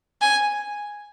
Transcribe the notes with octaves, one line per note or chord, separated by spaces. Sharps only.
G#5